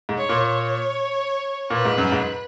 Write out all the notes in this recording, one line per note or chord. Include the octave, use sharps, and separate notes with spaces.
G#2
C#5
A#2
C#5
A#2 B4
G#2
F#2
G#2